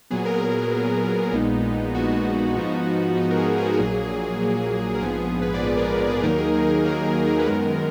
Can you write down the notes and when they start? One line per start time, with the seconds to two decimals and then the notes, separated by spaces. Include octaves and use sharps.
0.10 A#2 F#3 B3 G#4
0.26 A#4
0.36 G#4
0.41 A#4
0.72 A#2 F#3 B3
1.33 A#1 A#2 G#3 B3 D#4
1.95 A#1 A#2 G#3 B3 D#4 F#4
2.56 G#2 F3 B3 D#4
3.17 G#2 F3 B3 D#4 F#4
3.31 A#4
3.37 G#4
3.58 G#4
3.65 F#4
3.73 G#4
3.79 A#1 A#2 F#3 A#3
4.40 A#1 A#2 F#3 A#3
4.95 A#4
5.01 A#1 G#2 F3 B3 G#4
5.42 B4
5.54 D5
5.62 A#1 G#2 F3 B3 B4
5.77 A#4
5.93 G#4
6.08 G#4
6.23 D#2 D#3 F#3 A#3 D#4 A#4
6.38 G#4
6.54 G#4
6.65 A#4
6.70 G#4
6.85 D#2 D#3 F#3 A#3 D#4 A#4
7.05 G#4
7.26 G#4
7.39 B4
7.46 F#2 D#3 G#3 B3 A#4